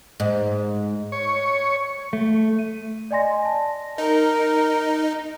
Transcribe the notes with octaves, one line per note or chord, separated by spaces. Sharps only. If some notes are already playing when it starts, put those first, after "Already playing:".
G#2
C#5
A3
D#7
D5 D#5 G#5 C6 A#6
A5
D#4 A#4